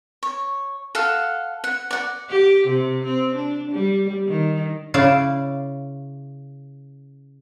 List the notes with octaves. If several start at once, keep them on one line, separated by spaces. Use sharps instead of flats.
C#5
A4 F5 F#5
F#5
D5 F#5
G4
C3
C4
D4
G3
D#3
C#3 E4 D5 F5